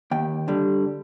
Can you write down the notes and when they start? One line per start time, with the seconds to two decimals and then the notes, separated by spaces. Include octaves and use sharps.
0.11 D#2 G5
0.48 D3 G3